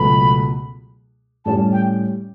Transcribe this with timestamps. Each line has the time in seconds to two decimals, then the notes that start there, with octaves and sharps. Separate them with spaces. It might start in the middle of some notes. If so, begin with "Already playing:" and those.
Already playing: C#2 B2 F#3 A3 B5
1.46 A2 G3 C#4 G4 A5
1.73 G5